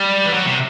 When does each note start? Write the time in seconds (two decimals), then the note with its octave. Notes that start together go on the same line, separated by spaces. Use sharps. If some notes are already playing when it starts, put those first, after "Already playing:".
Already playing: G3
0.26 E3
0.33 F#3
0.46 C3